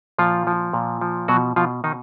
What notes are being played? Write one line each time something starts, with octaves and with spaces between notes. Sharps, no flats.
A#2 F3 F4
F3
A#2
F3
B2 F#3 F#4
B2 F3 F4
B2 D#3 D#4